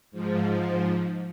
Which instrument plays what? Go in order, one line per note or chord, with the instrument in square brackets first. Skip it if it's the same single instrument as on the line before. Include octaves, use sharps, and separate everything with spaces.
[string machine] G#2 F3